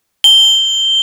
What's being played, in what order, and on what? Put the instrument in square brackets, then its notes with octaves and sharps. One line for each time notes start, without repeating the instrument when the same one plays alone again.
[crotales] G7